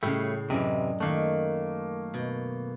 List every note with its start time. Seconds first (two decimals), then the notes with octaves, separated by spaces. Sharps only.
0.03 A2 C#3 G3 A3
0.50 F#2 C3 E3 D5 D#5
1.00 D#3 A3 A#3 F#5
2.14 B2